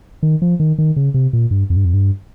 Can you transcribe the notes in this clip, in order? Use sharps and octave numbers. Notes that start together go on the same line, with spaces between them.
D#3
F3
D#3
D#3
C#3
C3
A#2
G2
F2
G2
F2
G2